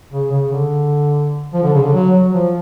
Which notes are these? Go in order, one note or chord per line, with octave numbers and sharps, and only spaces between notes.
C#3
C#3
D3
F3
D3
C#3
D3
F#3
F#3
F3